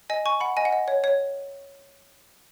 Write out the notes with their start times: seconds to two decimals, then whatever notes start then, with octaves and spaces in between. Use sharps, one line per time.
0.10 D#5 G#5
0.26 G#5 C#6
0.40 F#5 B5
0.57 D#5 G#5
0.65 F#5
0.72 D#5
0.88 C#5
1.04 C#5